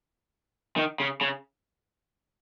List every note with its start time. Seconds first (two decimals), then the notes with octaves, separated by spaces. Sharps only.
0.77 D#3
1.00 C#3
1.21 C#3